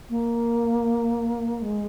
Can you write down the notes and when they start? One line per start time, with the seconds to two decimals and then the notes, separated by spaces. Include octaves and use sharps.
0.10 A#3
1.62 G#3